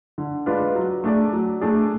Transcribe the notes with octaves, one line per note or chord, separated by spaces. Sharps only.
D3
G#3 D4 F4 B4
F#3
A3 D4 G#4 D5
F#3
A3 D4 G#4 D5